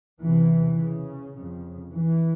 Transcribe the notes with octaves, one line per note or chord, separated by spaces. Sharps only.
E2 C3 E3
C#3
F2 C#3
E3